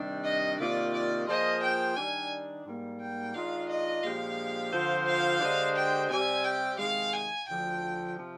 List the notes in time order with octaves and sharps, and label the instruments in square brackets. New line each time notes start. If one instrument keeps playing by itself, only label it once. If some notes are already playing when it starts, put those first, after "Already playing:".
Already playing: [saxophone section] C3 D#3 G3 D4
[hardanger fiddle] D#5
[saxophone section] C3 D#3 A#3 F4 [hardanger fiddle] D5
[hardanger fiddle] D5
[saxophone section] F3 A#3 F4 G#4 C5 [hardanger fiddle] D#5
[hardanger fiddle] G5
[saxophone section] D#3 G3 D4 [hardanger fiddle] G#5
[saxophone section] G#2 G3 A#3
[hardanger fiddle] G5
[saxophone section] D#3 G#3 D4 F4 [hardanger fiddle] F5
[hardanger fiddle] D#5
[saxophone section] A#2 F3 G#3 D4 G4 [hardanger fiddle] F5
[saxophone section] D3 F3 C4 F4 C5
[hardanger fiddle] F5
[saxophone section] D3 G#3 D4 G4 C5
[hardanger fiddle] G5
[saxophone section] C3 G3 C4 G4 D5 [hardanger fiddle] G#5
[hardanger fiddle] G5
[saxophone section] C3 D#3 G#3 [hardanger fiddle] F5
[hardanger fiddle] G#5
[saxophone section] D2 D3 F3 [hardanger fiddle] G5
[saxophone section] C3 F3